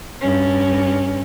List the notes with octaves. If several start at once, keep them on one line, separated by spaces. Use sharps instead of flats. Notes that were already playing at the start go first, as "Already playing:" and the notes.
G2 C#4